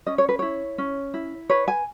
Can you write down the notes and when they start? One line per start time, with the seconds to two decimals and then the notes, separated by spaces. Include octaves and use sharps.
0.06 C#4 D#5
0.18 C#5
0.29 B4
0.39 E4 C#5
0.78 C#4
1.14 E4
1.50 B4 C#5
1.68 G#5